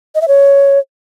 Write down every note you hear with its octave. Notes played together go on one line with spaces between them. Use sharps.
D#5
E5
C#5